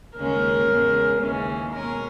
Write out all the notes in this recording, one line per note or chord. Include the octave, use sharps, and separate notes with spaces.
D#2 C#3 G#3 C#4 A#4
E2 C#3 G#3 C#4
D#2 C#3 E3 G#3 C#4
B2 G#3 C#4 A#4